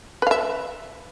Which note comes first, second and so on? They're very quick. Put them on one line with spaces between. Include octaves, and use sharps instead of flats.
B4 F5 E5